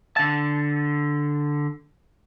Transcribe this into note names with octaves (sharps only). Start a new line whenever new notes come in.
D3 A5